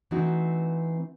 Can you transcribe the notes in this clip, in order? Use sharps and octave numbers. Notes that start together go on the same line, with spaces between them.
E3 A3 C4 D#4 F#4